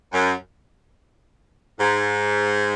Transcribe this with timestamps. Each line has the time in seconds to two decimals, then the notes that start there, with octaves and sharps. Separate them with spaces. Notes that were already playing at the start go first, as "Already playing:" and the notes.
0.13 F#2
1.79 G#2